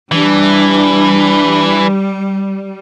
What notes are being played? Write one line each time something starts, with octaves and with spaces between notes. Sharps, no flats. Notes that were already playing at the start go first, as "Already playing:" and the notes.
E3 G3 D4